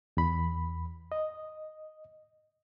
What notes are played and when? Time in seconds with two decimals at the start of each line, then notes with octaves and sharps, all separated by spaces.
0.17 E2 B5
1.12 D#5